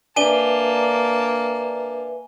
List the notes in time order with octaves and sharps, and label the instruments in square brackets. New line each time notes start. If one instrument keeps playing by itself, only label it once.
[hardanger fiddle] A#3 A5 [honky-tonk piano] D4 [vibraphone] B4 E5 [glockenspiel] G#5 D#7 G7